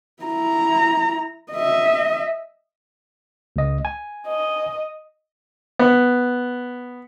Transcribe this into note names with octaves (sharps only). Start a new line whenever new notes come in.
E4 A#5
D#5 E5
C#2 D#5
G#5
D#5
B3